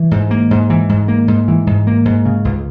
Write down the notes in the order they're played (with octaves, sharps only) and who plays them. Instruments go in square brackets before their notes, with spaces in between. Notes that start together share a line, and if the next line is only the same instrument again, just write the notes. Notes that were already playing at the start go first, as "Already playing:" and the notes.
Already playing: [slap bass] E3
G#2
A#3
G#2
E3
G#2
A#3
G#2
E3
G#2
A#3
G#2
C#3
C#2